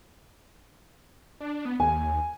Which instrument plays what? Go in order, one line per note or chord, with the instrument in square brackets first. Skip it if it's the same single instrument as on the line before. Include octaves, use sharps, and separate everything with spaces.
[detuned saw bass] D4
B3
[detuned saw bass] D#2 [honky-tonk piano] G#5